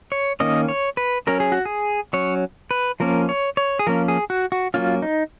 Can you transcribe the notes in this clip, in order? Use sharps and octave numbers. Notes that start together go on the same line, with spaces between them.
C#5
D#3 A#3 C#4 D#5
C#5
B4
F#3 C#4 A#4
G#4
F#4
G#4
F#3 C#4 C#5
B4
F3 A#3 C#4 A#4
C#5
C#5
G#4
F3 A#3 C#4 A#4
G#4
F#4
F#4
F#3 A#3 C#4 F4
D#4